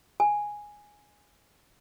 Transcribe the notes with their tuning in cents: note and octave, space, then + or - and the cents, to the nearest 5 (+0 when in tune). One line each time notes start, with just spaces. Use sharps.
G#5 -5